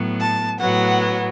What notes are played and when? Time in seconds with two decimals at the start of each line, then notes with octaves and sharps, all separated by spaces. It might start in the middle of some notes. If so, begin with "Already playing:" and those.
Already playing: A2 F#3 B3
0.20 A5
0.59 A2 F#3 B3 F#5